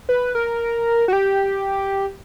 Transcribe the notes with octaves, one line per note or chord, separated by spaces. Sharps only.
B4
A#4
F#4
G4